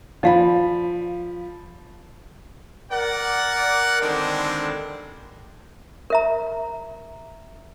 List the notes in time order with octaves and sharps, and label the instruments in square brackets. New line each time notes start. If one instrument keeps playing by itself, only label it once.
[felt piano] F3 B5 [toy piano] D5 F5
[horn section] A#4 D5 F#5
D3 D#3 G3 G#3 C4 D4
[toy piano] A#4 E5 A#5